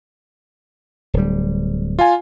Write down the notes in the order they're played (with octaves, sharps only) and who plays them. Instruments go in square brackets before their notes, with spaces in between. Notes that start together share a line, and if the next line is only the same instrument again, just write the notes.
[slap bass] D1 G3
[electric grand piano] F4 F5 G#5